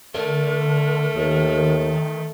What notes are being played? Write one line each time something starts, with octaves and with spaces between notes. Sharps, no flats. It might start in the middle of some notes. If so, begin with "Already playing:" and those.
D3 A3 A#4
D#2 D#3